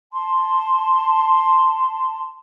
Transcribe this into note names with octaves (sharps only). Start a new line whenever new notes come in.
A5 C6